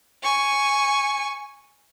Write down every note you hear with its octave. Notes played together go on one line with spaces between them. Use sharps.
G#5 C#6